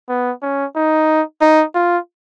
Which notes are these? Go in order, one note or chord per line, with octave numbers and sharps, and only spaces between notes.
B3
C#4
D#4
D#4
F4